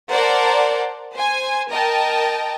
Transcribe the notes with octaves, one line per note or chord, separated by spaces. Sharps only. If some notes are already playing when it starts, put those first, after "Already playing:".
A#4 C5 D5 F#5 A5
C5 G#5
A#4 D#5 G5 A5